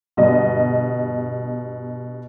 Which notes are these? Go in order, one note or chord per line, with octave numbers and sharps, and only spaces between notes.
G1 B2 D#5